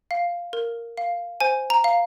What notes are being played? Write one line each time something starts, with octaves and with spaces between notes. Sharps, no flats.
F5
A#4
F5
C5 G#5
A#5
F5